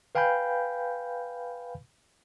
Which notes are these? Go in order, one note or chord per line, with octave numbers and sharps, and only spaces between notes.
B4 F5 G5 G#5 B5 G6